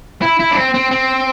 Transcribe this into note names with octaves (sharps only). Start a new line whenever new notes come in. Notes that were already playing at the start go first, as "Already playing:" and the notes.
E4
E4
D4
C4
C4
C4